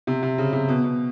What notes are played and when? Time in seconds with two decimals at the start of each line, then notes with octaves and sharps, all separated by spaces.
0.07 C3
0.23 C3
0.38 C#3
0.53 C3
0.68 B2
0.84 B2